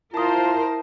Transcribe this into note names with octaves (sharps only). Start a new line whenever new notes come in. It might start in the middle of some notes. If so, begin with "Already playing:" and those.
E4 F4 A#4 C5 A5 D#6